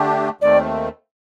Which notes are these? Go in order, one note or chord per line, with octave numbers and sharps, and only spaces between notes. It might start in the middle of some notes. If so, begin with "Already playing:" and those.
Already playing: D3 A3 D4 G4
D#2 D#3 A3 C4 D5